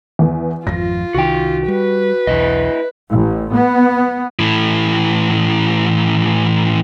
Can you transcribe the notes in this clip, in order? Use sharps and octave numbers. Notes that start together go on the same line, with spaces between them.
E2 B3
G#1 F2 F3 F4 A#6
C2 D#3 F#4 G5
G3 B4
B1 E2 E4 C5 D#5
A1
B3
A2 E3